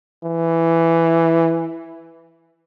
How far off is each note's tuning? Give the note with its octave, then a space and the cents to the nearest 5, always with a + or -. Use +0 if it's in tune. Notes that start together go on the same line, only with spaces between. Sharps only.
E3 +5